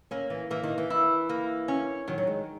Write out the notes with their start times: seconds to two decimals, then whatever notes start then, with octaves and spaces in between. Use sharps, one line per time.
0.11 A#3 C#4
0.30 E3
0.51 E3 A#3
0.63 D#3
0.78 E3
0.90 E4
1.29 A#3
1.68 C#4
2.08 D#3 F#3
2.18 F#3
2.27 G#3